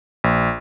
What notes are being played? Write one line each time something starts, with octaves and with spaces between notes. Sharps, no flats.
A#1